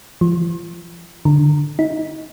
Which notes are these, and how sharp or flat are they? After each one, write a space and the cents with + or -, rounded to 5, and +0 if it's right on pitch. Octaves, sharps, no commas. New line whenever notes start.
F3 -35
D3 +10
D#4 +20